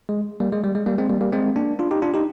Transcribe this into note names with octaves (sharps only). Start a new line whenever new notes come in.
G#3
G3 A#3
G#3
G3
G#3
G3 A#3
G#3 C4
G3 A#3
G3 A#3
G#3 C4
A#3 D4
D4 F4
D#4 G4
D4 F4
D#4 G4